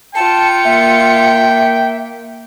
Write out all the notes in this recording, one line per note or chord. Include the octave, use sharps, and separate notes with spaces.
F4 G5 A5 C#7
A#3 E5